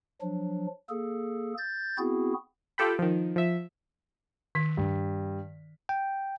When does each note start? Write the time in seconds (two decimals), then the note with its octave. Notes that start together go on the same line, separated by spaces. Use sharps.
0.21 F3 F#3 D4
0.89 A#3 G#4 A4
1.57 G6 A6
1.98 B3 C4 E4 F#4 G#4
2.78 F4 G4 A4 G5 B5
2.99 D#3 F3
3.36 F3 E5
4.55 D#3 B6
4.77 G2
5.89 G5